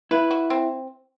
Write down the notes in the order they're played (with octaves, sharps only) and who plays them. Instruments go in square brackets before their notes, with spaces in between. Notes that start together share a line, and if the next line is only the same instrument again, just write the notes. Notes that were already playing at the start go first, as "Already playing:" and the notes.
[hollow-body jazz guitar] E4 [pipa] B4
[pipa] F#4
C4